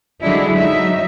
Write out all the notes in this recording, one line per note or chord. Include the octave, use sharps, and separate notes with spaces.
D3 F#3 G#3 D4 E4
F#3 D#4 E5